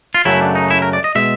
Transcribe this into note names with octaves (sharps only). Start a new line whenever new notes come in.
F4
F#2 C#3 F#3 A3 E4
D4
D#4
E4
A#4
D5
D#5
B2 G#3 E5